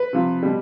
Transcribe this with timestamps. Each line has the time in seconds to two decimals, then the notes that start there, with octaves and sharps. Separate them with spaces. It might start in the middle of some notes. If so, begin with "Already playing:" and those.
Already playing: B4
0.13 C3 F3
0.43 B2 G3